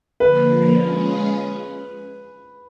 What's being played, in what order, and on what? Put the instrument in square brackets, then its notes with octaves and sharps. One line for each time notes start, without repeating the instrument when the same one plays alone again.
[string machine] D3 F3 A#3 [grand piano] B4
[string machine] G#3 C#4 F4 G#4